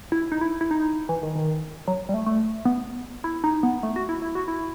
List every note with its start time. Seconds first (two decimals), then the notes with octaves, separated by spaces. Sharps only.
0.12 E4
0.32 D#4
0.41 E4
0.61 E4
0.71 D#4
1.09 E3
1.23 D#3
1.35 D#3
1.88 F#3
2.09 G3
2.14 A3
2.26 A3
2.65 B3
3.24 E4
3.44 D#4
3.63 B3
3.83 A3
3.96 F#4
4.09 E4
4.22 E4
4.35 F#4
4.48 E4